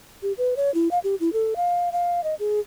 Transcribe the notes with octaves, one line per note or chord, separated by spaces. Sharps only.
G4
B4
C#5
E4
F5
G4
E4
A4
F5
F5
D#5
G#4